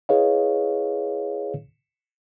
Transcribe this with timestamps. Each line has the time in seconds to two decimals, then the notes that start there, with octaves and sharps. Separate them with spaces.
0.09 E4 G#4 B4 C#5 D#5 F5